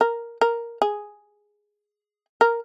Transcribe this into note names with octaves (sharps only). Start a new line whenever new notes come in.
A#4
A#4
G#4
A#4